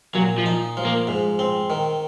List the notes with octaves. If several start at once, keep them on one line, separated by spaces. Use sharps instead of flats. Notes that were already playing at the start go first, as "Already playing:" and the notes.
A#2 F#3
F3
D#4
F3
A#3
G#2
C4
D#3